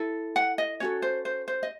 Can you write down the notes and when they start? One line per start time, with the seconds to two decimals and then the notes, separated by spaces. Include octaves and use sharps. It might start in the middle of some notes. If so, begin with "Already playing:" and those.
Already playing: E4 A4
0.36 F#5
0.58 D#5
0.80 C#4 F#4 A4 C#5
1.02 C5
1.25 C5
1.48 C5
1.63 D#5